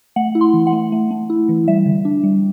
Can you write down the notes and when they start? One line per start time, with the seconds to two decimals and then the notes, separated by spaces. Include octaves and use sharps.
0.16 A3 F#5
0.35 E4
0.41 C6
0.53 E3
0.67 F#5
0.72 A3
0.92 A3
1.11 A3
1.30 E4
1.49 E3
1.68 G3 E5
1.86 D3
2.05 D4
2.23 G3